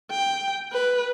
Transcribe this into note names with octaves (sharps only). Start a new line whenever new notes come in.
G5
B4